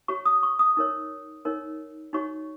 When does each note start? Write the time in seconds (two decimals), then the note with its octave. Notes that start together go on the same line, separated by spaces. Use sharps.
0.08 F#4 C#5 C#6
0.26 D#6
0.43 C#6
0.59 D#6
0.77 D#4 A#4 C#5
1.45 D#4 A#4 C#5
2.13 D#4 F#4 C#5 C#6